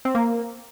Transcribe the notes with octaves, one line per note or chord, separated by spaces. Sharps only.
C4
A#3